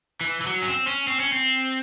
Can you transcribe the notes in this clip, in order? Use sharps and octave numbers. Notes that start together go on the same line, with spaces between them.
E3
E3
F#3
C#4
C4
C#4
C4
C#4
C4